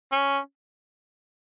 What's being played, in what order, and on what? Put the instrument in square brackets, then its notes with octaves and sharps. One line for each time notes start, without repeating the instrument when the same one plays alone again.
[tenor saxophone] C#4